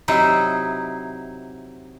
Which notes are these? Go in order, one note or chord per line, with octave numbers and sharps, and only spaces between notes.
C3 F#3 D#4 E4